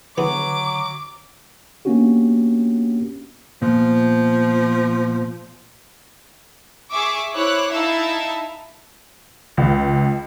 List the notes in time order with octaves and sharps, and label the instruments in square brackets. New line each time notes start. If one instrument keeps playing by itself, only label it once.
[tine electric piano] D3 [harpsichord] E3 B3 G#4 [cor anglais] F#3 [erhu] D6
[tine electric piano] A#3 B3 C#4 D4 F#4 G4
[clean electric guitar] A#2 B3 [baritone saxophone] F3
[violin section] G#4 E5 C#6 D6
E4 C5 C#5 D6 F#6
D#4 E4 A4 E5 F5 A5
[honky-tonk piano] C#2